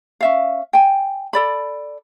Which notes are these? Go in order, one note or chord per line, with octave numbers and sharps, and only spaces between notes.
C#4 E5 F5
G5 G#5
A4 D5 B5